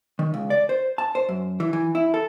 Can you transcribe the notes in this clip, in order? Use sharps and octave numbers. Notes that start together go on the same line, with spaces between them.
D#3
C#2
D5
C5
A5
C5
F#2
E3
E3
E4
A4